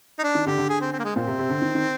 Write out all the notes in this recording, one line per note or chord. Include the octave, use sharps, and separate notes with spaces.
D#4
D4
D#3
D3 G4
D3
G#4
C4
C4
A#3
G#3
A#2 C4
C3
C3
D3
D#3
D#3